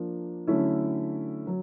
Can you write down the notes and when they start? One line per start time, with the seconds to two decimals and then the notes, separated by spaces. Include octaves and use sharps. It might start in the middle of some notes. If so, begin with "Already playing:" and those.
Already playing: F3 A#3 D4
0.47 D3 F#3 A3 C#4 E4
1.47 F#3